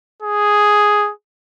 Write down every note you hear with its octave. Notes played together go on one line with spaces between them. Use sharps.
G#4